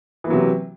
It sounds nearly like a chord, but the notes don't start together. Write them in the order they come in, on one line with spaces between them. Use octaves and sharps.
E3 A#3 F#3 C3